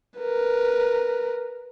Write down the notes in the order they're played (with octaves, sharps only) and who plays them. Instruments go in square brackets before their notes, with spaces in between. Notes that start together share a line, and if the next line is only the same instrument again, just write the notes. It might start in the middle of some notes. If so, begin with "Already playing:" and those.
[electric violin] A#4 B4